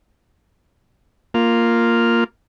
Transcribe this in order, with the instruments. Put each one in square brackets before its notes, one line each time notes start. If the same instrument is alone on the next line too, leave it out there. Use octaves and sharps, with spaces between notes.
[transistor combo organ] A#3 F4